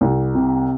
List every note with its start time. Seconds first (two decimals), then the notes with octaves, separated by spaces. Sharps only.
0.01 C2
0.35 C3